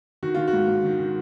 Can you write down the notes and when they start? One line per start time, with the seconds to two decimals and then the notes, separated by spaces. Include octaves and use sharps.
0.23 D#3 F#4
0.34 D#3 F4
0.47 F#4
0.53 G#2
0.68 G#2
0.84 D#3
0.99 D#3